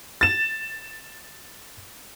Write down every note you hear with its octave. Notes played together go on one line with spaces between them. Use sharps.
A6 E7